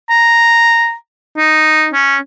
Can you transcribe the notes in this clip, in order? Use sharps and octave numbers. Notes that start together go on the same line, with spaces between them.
A#5
D#4
C#4